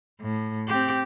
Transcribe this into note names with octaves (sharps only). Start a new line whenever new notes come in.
A2
C4 G4